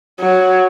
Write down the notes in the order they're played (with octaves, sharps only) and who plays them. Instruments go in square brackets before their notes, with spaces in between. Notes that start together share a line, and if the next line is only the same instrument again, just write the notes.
[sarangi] F#3